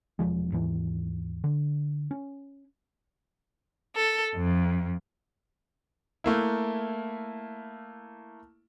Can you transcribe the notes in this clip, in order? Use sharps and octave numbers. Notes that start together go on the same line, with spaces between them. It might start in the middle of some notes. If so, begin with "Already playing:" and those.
E1 F#2 F3 G#3
D#2 G#2 E3
D3
C#4
A4
F2
A3 A#3 E4